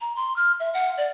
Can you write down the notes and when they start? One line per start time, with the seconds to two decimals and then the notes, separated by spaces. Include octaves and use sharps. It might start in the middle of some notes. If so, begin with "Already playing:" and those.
0.01 A#5
0.16 C6
0.36 F6
0.60 E5
0.74 F#5
0.98 D5